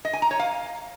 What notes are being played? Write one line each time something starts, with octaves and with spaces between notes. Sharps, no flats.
D#5
G#5
A#5
C#5
F5